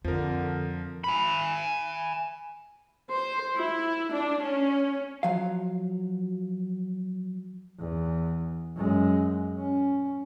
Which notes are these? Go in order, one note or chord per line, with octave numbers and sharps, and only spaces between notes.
F2 D3 F3 A#4
G#5 B5
C5
E4
D4
C#4
F3 F#3 F5
E2
F#2 G#3
C#4